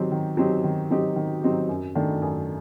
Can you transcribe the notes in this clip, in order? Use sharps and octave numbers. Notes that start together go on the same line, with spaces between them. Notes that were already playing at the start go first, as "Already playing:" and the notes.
Already playing: D#3 F#3 C4 D#4 G4
D#3
F#3 C4 D#4 G4
D#3
F#3 C4 D#4 G4
D#3
F#3 C4 D#4 G4
F#2
D#3 A3 D4
F#2